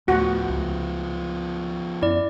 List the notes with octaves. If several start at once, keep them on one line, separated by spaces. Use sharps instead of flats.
D2 A2 F3 A3 B3 F#4
C#2
F#2 B3 E4 D5